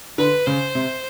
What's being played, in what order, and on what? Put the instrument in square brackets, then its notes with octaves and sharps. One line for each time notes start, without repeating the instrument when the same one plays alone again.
[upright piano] D3 [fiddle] B4
[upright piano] C#3 [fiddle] C5
[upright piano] C3